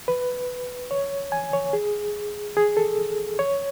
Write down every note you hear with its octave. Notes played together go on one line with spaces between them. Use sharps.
B4
C#5
G#5
C#5
G#4
G#4
A4
C#5